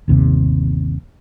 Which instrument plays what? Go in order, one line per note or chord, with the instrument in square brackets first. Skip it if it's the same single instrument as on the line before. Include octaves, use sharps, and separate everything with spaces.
[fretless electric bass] G1 D#2 C3